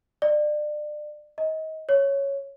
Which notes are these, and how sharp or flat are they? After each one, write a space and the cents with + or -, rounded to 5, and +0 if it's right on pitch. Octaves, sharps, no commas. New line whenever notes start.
D5 +30
D#5 +25
C#5 +0